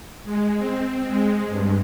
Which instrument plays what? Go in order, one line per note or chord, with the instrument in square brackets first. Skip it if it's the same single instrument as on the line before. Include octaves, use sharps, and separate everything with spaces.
[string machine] G#3
C4
G#3
G2